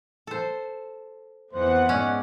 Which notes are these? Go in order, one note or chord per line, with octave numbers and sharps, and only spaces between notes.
A4 C5
F2 E3 B3 C5 F#5
G#2 C#4 D5 D#5